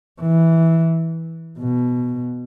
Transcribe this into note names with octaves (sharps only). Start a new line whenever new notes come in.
E3
B2